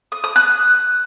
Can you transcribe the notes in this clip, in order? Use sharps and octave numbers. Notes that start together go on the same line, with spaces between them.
D#6
D#6
F#6